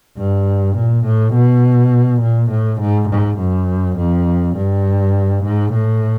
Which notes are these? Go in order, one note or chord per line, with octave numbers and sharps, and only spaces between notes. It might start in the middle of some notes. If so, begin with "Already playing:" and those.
G2
A#2
A2
B2
A#2
A2
G#2
G#2
F#2
F2
G2
G#2
A2